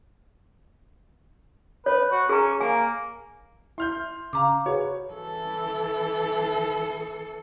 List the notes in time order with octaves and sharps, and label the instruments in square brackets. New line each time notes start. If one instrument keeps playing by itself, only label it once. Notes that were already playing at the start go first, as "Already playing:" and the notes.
[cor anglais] B4 [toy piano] C#5
[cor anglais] F#4
[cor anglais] C#4 [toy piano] G#4 A#5
[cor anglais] A#3 [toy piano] G#5
[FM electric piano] E4 [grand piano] C6 F6 G6
[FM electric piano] C#3 [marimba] F5 A#5 D6
[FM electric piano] F#4 G#4 B4 [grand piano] C#5
[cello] E3 A4